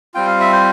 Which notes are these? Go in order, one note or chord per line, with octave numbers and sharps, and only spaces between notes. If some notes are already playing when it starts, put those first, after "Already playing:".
G3 C4 F4 G5
F5
E5
C5